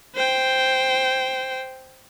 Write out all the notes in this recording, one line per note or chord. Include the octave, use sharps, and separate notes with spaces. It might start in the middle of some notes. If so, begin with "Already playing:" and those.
C5 G5